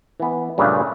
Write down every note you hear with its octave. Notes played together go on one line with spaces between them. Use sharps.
E3 B3
G2 A#2 C#3 A3 C#4 D4